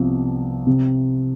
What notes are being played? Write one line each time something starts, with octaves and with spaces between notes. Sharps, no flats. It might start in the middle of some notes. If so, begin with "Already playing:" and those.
Already playing: C2 C3 F3 B3
C3